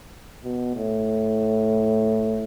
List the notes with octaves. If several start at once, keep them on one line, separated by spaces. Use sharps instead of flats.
B2
A2